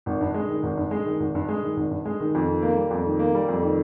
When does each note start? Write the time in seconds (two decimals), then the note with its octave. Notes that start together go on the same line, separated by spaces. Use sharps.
0.06 G#1
0.21 G2
0.34 G#3
0.49 D#3
0.63 G#1
0.77 G2
0.91 G#3
1.06 D#3
1.20 G#1
1.35 G2
1.48 G#3
1.63 D#3
1.77 G#1
1.91 G2
2.05 G#3
2.20 D#3
2.35 F2
2.48 D#3
2.62 A#3
2.76 G3
2.91 F2
3.06 D#3
3.19 A#3
3.35 G3
3.49 F2
3.63 D#3